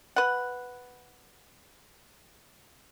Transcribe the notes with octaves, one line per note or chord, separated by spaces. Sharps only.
B4 F#5